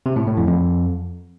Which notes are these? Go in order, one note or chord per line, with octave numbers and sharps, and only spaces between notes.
C3
A2
A2
F2
F2